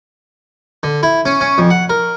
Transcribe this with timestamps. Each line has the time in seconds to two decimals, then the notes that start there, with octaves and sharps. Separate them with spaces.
0.83 D3
1.03 E4
1.25 C#4
1.41 C#4
1.58 F2
1.70 F#5
1.89 A#4